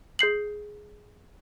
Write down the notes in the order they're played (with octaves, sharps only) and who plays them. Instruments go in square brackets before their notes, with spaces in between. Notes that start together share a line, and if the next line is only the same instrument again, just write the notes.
[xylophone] G#4 G6 C7 F#7